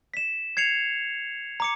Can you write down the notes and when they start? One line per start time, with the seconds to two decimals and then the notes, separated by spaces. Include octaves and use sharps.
0.14 B6 E7
0.57 G#6 C7 C#7 F7
1.60 A#5 D6 C#7